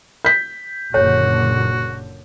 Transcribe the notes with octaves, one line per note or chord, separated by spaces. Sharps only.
G6 B6
F#1 A#2 D3 F#4 C#5